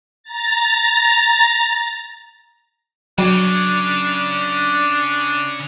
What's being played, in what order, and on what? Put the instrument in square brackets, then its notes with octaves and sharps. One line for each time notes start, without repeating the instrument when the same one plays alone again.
[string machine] A#5 A6
[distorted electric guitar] C#3 [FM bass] F#3 [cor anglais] D4